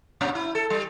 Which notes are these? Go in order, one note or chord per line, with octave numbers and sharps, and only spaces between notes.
G2 A#2 C#4
E4
A4
G3